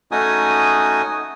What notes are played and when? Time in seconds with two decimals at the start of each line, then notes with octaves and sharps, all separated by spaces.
0.12 A3 C#4 D#4 F#4 G#5 D#6